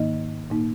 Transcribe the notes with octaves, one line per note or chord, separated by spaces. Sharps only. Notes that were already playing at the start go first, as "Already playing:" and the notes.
Already playing: G#2 D#3 A#3 D#4 D#5
A#2 A#3 D#4